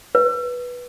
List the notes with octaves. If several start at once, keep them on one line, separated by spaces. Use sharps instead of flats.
B4